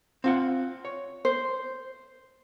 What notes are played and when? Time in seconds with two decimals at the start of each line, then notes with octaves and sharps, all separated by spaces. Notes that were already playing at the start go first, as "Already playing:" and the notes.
0.24 C4 F4 F#5
0.85 C#5
1.25 C5